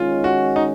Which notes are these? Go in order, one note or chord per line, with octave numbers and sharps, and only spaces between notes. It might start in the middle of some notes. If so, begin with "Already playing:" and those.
Already playing: D#3 G#3 C#4 F4
F#4
D#4